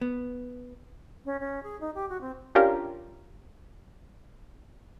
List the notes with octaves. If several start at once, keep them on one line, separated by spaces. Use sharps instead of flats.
B3
C#4
C#4
G#4
D#4
G4
F#4
C4
C#4 D4 F4 G4 A#4